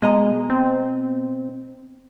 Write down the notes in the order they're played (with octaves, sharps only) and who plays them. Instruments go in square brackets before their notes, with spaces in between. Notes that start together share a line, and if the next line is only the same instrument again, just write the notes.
[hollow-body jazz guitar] B2 D#5 A#5 [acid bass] G#3
[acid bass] C4